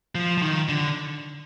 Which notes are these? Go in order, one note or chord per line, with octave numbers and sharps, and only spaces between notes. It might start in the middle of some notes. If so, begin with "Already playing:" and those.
F3
F3
D#3
D3